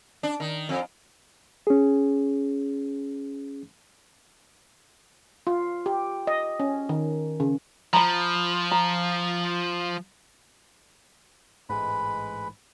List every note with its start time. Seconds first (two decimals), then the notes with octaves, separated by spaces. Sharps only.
0.23 D4
0.40 D#3
0.69 F2
1.67 C#4 G#4
5.47 F4
5.86 G4
6.27 D#5
6.60 C#4
6.89 D#3
7.40 C#3
7.93 F3 A#5 B5
8.71 A#5
11.69 A1 G#2 G#3 B4 B5